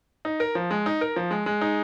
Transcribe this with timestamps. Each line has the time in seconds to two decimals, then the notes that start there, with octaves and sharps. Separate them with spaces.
0.25 D#4
0.40 A#4
0.55 F3
0.71 G#3
0.86 D#4
1.01 A#4
1.16 F3
1.31 G#3
1.46 G#3
1.61 D#4